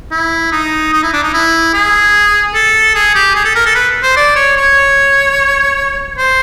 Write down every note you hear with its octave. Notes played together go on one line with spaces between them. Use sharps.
E4
D#4
D#4
E4
D4
D#4
E4
G#4
A4
G#4
G4
G#4
A4
A#4
A4
B4
C5
D5
C#5
C#5
C5